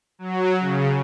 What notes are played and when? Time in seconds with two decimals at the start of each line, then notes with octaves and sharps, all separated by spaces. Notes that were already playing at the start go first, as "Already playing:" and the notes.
0.19 F#3
0.60 C#3